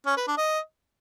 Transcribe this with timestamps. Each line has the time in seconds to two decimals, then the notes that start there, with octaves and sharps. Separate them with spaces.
0.06 C#4
0.17 B4
0.27 D4
0.38 D#5